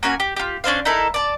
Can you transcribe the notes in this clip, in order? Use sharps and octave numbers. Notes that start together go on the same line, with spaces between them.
A#3 C#4 F#4 G#5
G4
F4 G4
C#4 D4 C5 F5
D#4 E4 A4 A#4
D5 A5